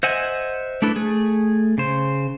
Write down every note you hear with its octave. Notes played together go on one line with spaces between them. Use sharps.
C5 D#5 E5 F#5 G#5
A3 D4 E4 A4 B4
A3 G#4
C#3 C5